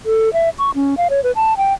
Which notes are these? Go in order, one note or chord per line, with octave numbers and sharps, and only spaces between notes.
A4
E5
C#6
C#4
F5
C#5
B4
A5
G5